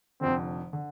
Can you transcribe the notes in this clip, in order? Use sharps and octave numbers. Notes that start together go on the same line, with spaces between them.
F1 F2 D3 C4
D3